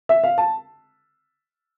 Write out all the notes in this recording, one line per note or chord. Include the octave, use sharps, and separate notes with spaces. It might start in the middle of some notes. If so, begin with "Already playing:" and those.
E5
F5
A5